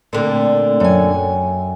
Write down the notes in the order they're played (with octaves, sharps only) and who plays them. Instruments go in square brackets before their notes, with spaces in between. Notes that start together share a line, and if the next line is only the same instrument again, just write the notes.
[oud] A#2 D3 [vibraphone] A3 C4 G5
[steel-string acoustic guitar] F#2 G#5 [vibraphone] C#5 G5